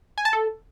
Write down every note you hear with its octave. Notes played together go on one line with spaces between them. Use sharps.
G#5
A5
A4